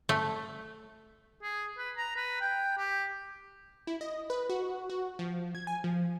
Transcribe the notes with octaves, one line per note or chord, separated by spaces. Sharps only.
A3
G#4
B4
A#5
B4
G5
G4
E4
D#5
B4
F#4
F#4
F3
G#6
G#5
F3